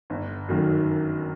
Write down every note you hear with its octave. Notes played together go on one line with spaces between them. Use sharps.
G1
F#2 D#3 F#3 A#3